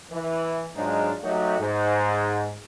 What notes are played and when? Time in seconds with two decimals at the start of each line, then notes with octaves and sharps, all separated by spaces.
0.11 E3
0.75 G#2 F#3 G#3 D4 D#4 F4
1.23 F#3 A3 D#4 F#4 G4
1.59 G#2